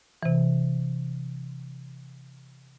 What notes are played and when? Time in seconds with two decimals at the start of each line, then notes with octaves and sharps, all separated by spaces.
0.23 C3 E3